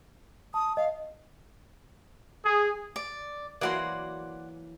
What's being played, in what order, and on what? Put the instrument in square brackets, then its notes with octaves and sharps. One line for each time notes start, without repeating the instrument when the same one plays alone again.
[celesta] A5 [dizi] D#6
[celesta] D#5 [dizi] F5
[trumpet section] G#4
[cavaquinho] D5
[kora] E3 F#3 A#3 [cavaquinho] D5 F#5 C6